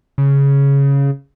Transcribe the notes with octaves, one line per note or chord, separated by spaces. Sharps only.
C#3